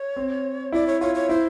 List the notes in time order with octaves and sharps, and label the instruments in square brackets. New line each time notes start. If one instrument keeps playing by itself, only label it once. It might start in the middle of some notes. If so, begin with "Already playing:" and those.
Already playing: [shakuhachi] C#5
[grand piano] C4
[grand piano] E4 [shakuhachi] D5
[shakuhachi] C#5
[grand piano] F4 [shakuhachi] C#5
[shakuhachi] C#5
[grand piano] E4 [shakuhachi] C5